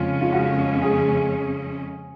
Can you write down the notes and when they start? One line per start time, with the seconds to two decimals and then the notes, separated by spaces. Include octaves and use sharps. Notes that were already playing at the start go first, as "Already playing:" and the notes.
Already playing: F2 C#3 G#3 C#4 F4
0.21 F4
0.32 F#4
0.82 G#4